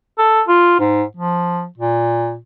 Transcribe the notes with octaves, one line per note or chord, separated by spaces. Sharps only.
A4
F4
G#2
F3
A#2